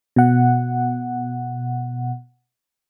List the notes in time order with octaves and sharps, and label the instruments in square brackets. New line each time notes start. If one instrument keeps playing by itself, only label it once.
[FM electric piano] B2 F#5